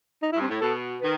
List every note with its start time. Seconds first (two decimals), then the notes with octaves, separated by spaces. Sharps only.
0.22 D#4
0.32 G2 E4
0.41 C4
0.48 A2
0.61 B2 A4
1.01 D#3 B4